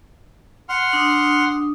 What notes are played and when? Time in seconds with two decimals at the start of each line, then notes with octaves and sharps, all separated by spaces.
0.69 F#5 C6 F6
0.93 D4 D#6